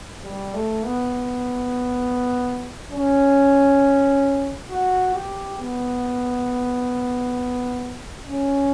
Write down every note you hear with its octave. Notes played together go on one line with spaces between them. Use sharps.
G3
A3
B3
C#4
F#4
G4
B3
C#4